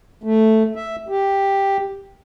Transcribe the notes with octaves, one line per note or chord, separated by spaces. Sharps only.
A3
E5
G4